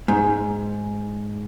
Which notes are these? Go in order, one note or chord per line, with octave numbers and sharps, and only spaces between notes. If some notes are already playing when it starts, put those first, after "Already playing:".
G#2